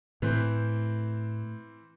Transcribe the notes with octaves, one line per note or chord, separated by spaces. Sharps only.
A2 E3 A3 C4 C5